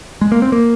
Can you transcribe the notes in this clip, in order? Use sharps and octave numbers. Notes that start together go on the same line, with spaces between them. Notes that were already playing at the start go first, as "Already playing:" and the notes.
G#3
A#3
C4
A#3